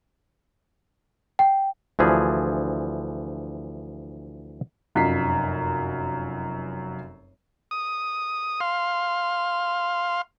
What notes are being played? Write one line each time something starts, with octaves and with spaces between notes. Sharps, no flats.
G5
D2 E3 F3 G#4
F1 F#2 F4 D#5 B6 C7
D#6
F5 C6